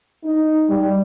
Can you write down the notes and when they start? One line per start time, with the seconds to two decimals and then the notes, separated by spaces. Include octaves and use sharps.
0.24 D#4
0.70 G3